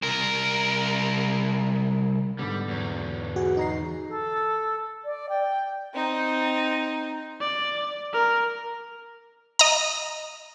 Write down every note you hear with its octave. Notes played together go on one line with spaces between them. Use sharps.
C2 A#4
G#2 D3 G3 B3
E2 F#3
F#4 G#4
D#4 A#5 C7
A4
D5
G5
C4 D#4
D5
A#4
D#5 A#5